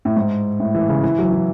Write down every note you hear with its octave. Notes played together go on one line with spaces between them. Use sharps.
A2
G#2
A2
E3
C#3
E3
F#3
E3